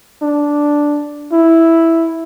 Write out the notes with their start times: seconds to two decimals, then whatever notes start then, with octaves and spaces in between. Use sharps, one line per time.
0.22 D4
1.32 E4